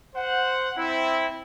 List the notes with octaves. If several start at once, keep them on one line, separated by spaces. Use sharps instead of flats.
C5 F#5
C4 E4